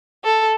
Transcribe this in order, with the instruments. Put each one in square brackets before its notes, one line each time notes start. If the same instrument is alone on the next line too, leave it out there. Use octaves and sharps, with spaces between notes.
[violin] A4